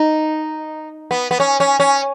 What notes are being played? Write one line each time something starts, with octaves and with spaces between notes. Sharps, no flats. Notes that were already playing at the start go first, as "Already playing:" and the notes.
Already playing: D#4
B3
B3
C#4
C#4
C#4